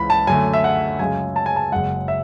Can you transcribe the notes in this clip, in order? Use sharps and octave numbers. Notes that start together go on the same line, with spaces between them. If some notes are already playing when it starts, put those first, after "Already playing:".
Already playing: C#2 C#3 E3 G#3 B5
A5
F#2 D3 A3 G#5
E5
F#5
F#2 C#3 G#3 G#5
A5
G#5
A5
F#1 F#2 C#3 G#3 F#5
E5